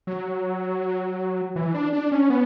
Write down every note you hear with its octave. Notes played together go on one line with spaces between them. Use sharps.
F#3
E3
D4
D4
C#4
B3